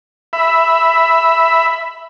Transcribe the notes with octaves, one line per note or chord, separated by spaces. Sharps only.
E5 B5